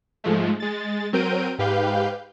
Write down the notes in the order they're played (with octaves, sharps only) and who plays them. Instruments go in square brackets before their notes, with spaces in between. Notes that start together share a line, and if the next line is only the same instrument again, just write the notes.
[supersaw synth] G#2 F3 G#3 A3
G#3 A6
F#3 C4 A#4 G6 D7 D#7
G#2 G4 B4 F5 G6